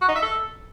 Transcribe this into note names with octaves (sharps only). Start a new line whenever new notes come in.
F#4
D#4
E5
A4